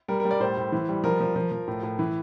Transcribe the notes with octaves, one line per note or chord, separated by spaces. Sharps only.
G3 A#4
A#4
G3
D5
A2 C5
A2
E3
G3
F3 A#4
F3
F3
F3
A2
A2
E3